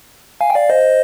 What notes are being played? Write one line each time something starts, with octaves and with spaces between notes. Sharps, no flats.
F5 G#5
G5
D5 F5
C5 D#5